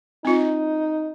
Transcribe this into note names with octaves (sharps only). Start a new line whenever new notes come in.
C4 D#4 F4